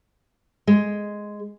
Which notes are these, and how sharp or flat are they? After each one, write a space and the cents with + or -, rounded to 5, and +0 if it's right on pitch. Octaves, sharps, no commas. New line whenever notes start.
G#3 +0